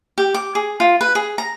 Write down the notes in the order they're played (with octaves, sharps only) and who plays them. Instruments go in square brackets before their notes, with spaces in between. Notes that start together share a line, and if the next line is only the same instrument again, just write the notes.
[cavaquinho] G4
D6
G#4
F4
B4
G#4
A#5